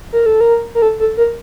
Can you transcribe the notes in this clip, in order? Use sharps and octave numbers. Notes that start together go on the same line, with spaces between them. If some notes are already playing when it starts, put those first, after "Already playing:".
A#4
A4
A#4
A#4
A4
A4
A#4